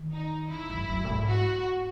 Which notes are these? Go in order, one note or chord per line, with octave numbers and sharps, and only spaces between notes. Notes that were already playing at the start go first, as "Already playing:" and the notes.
Already playing: D#3
D#4
C#3 E4
F#2
F#2
A2
G#2
F#4